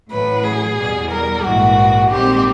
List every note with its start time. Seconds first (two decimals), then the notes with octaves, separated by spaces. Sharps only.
0.11 A1 A2 F#3 B4
0.44 G#4
0.78 E2 B2 G3
1.11 A#4
1.43 A#1 G#2 E3 F#4
2.10 A#1 G#2 D#3 G3 C4 G4